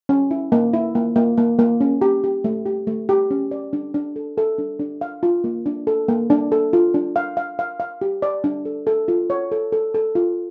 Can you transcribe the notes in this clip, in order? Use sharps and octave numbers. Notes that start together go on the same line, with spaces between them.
C#4
E4
A#3
E4
A#3
A#3
A#3
A#3
C#4
G4
G4
A3
G4
A3
G4
C#4
D5
D4
D4
A4
A4
D4
D4
F5
F4
A#3
D4
A4
A#3
D4
A4
F4
D4
F5
F5
F5
F5
G4
D5
D4
A4
A4
F4
C#5
A4
A4
A4
F4